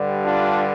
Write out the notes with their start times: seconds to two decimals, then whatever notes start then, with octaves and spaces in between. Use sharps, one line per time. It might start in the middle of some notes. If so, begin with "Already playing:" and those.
Already playing: G2 D3 G3
0.26 D4 F4